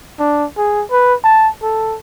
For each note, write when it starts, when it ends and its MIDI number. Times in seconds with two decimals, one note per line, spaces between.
0.19 0.46 62
0.57 0.84 68
0.91 1.14 71
1.24 1.49 81
1.63 1.97 69